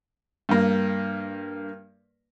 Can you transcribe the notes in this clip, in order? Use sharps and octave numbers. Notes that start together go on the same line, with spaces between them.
G2 A#3